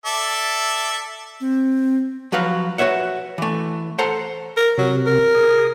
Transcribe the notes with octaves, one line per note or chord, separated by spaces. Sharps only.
A4 D5 E5
C4
F3 F#3 F#4 B4 F5
F#4 B4 C#5 E5 F#5
E3 A3
A4 C5 F#5 A5 A#5
A#4
C3 F#3
A#4
G#4